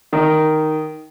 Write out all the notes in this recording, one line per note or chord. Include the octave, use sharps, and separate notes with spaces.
D#3